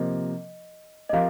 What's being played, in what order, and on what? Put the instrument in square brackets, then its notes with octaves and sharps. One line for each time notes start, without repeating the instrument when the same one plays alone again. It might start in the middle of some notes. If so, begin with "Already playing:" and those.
Already playing: [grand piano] C3 F3 A#3 [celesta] D#5
[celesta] D#5
[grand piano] F3 C4 G4 A#4 [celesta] F5